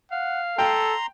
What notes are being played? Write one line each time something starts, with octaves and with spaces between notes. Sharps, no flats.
F5 F#5
A4 G5 A#5 C6